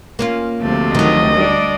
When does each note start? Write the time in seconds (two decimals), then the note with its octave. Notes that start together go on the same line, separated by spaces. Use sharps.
0.19 A#3 C#4 F4
0.61 D2 C3 F3 A3
0.95 D#3 F#3 D#5
1.33 G3 D4 D5